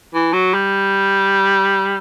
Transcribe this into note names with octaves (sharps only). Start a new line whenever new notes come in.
E3
F#3
G3